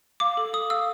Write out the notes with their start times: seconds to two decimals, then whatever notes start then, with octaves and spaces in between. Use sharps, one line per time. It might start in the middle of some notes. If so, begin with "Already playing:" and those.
0.20 F5 D6
0.37 A4
0.53 A4 D#6
0.70 F5 E6